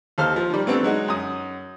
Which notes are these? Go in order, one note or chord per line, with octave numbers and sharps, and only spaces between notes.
D#2 A4 C5 F5 F6
F3
D#3 G3
E3 A3 B3 C4 D4
F#3 G#3 D#4 F#4
F#2 D#6